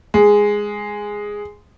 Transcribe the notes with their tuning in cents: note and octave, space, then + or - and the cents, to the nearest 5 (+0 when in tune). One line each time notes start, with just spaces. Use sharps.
G#3 -5